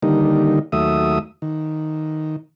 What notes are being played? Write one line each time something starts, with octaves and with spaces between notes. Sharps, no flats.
D3 D#3 G3 A#3 D#4
D#2 F#3 A3 E5 D#6
D#3